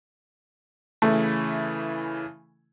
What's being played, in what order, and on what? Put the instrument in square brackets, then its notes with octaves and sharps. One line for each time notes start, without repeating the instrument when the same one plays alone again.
[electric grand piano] C#3 E3 E4 [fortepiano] A3